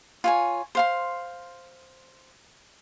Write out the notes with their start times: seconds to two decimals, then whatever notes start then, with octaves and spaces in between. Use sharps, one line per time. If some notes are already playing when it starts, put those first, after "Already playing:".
0.24 F4 C#5 G#5
0.75 C5 F5 C6